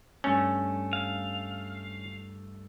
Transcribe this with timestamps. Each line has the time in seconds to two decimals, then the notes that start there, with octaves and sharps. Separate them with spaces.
0.24 G2 A3 C#4
0.93 F5